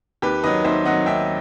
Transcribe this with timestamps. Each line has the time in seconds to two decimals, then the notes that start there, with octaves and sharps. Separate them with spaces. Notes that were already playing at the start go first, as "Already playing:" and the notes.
0.22 D#2 G4 B4
0.43 D#3 F#3 B4 D#5
0.65 D#2 C5 E5
0.85 D#3 F#3 D#5 F#5
1.06 D#2 E5 G5